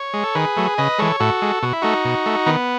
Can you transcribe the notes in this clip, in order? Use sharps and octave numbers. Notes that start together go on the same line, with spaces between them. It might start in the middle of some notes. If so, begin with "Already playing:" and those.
Already playing: C#5
G#3
A4
D#3 G#4 B4
F#3 A3
C#3 B4 D#5
E3 G#3 A4 C#5
A2 F#4 A4
G#3
B2 F#4
E4
A3 D#4 F#4
B2
A3
D#3 B3